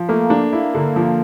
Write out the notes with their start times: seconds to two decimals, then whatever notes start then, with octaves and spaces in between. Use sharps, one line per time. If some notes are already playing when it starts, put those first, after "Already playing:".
Already playing: F3
0.09 A3 A#3
0.30 D4
0.53 E4
0.75 D3
0.96 F3